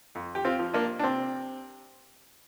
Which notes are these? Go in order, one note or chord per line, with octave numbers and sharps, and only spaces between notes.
F2
G4
C4 F4
F3
A#3 D4
D4
C3 C4